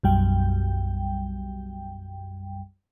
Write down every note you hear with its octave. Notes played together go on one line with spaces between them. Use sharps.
B1 F#2 G3 G5